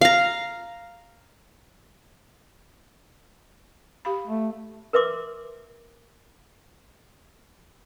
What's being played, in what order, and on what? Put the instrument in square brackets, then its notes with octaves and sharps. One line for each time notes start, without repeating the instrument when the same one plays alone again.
[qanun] F5 A#5
[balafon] G4 F5 B5
[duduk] A3
[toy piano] A#4 B4 E5 C6 D6